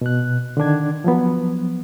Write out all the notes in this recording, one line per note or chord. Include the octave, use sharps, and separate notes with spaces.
B2 F#6
D3 D#3 D4 G#6
F3 F#3 B3